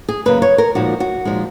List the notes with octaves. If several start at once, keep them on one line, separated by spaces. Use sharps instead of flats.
G#4
F#2 C#3 F#3 A#3 B4
C#5
A#4
A#2 F3 G#3 D#4 F#4
F#4
A#2 F3 G#3 D#4